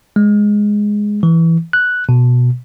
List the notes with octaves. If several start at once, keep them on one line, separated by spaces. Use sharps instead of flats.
G#3
E3
F#6
B2